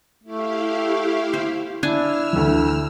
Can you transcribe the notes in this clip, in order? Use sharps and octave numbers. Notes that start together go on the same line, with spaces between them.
A3 E4 G4 F5
C5
D4 E4 G#5 E6 F6
D2 E3